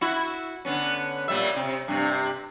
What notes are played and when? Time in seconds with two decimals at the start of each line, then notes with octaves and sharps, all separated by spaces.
0.01 E4 F#4
0.65 D3 B3 C#4
1.28 A#2 G3 E5
1.56 C3
1.88 G2 C3